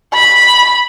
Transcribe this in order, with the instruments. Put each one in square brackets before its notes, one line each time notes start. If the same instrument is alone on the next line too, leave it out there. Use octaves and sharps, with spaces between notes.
[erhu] B5